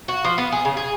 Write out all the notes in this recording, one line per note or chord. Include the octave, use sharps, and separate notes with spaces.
F#4
F3
B3
G#4
C#3
G#4